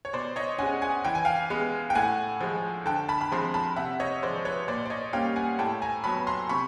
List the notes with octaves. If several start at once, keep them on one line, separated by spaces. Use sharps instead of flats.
C#5
B2 C5 D5
C#5 D#5
G#3 C#4 F#5 G#5
F#5 G#5
E3 G5
G#5
F5 G5
G#3 B3
G5
A2 F#5 G#5
F3 G#3
D3 G5 A5
A5 B5
B5
F3 G#3 C4 A#5 C6
A5 B5
C3 E5 F#5
C#5 D#5
F3 G#3 C5 D5
B4 C#5
A#2 C5 D5
D5
C#5 D#5
G3 A#3 C#4 F5 G5
F#5 G#5
A2 G5 A5
G#5 A#5
F#3 B3 A5 B5
A#5 C6
C3 B5 C#6